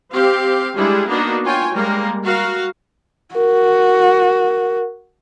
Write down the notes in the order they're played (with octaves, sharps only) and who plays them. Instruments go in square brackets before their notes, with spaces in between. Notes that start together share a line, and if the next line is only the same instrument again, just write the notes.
[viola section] C4 G4 F5
G3 G#3 D4 E4 G#4
A#3 B3 D4 D#4 F#4
F4 C#5 G5 G#5
G3 G#3 A#3 A#4
F#4 A#4 F5
[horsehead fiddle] F#4 [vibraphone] A#4